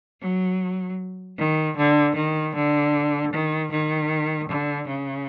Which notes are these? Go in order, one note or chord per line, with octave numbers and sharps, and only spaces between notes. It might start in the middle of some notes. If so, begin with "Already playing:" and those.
F#3
D#3
D3
D#3
D3
D#3
D#3
D3
C#3